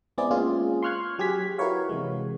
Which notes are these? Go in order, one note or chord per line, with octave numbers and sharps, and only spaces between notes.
G#3 B3 C4 E4 G#4 D5
G#3 A#3 C#4 F4 G#4
C6 C#6 F6 F#6 G#6
F#3 G4 G#4 G#6 B6
E4 F#4 A#4 B4 C#5 F5
C3 E3 G#3